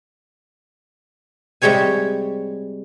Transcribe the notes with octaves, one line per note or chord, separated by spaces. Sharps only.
C3 G3 G#3 G#4 C#5 G#5